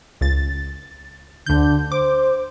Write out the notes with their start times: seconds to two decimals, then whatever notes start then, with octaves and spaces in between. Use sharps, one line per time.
0.21 C#2 A6
1.46 D2 D3 G6
1.92 C5 D6